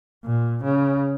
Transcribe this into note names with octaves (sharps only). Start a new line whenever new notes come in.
A#2
C#3